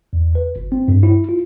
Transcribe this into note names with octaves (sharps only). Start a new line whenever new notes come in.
E2
B4
G1
C4
G2
E4
F4